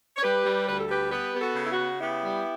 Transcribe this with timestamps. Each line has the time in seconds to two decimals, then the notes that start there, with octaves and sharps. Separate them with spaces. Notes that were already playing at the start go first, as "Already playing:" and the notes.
0.17 C#5
0.22 G3 G4 B4
0.44 G3
0.67 D2 B4
0.78 A4
0.88 G3 G4 B4
1.10 B3 G4 B4
1.33 B3 G4
1.40 F#4 A4
1.55 C#3
1.65 E4
1.70 F#4
1.78 C#3
1.99 B3 E4 G4
2.22 G3